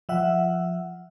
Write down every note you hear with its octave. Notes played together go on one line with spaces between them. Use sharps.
F3 E5 F#5